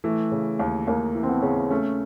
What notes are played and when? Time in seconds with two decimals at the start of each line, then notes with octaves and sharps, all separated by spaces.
0.04 E3 A3
0.32 C#3
0.59 D#2
0.87 D#2 A#3
1.15 E3
1.23 C4
1.28 B3
1.42 C#3
1.70 A3 C#4